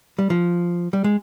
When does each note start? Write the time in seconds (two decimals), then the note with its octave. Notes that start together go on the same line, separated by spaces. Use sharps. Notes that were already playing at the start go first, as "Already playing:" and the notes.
0.18 G3
0.30 F3
0.93 G3
1.04 G#3